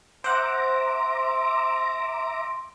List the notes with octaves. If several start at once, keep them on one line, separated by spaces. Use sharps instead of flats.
C5 E5 F#5 A#5 C6 D6